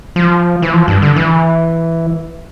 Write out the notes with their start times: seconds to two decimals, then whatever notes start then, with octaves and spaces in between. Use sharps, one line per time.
0.16 F3
0.62 E3
0.73 F3
0.88 G2
1.02 D3
1.16 E3